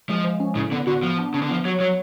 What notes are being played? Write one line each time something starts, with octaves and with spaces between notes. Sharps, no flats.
F3 G#3
F3
C#4
A2 C#3
D3 B3
D3 F#4
F3 B3
D4
C#3 D4
D3
F3 B3
F#3 C#5
F#3 C#5